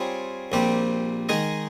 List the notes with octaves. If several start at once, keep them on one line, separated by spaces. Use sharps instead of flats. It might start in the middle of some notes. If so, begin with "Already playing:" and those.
Already playing: G3 C4 F4 G#4 C#5
A#1 A#2 G3 C4 G4
D#3 G#3 D#4 G#4 D#5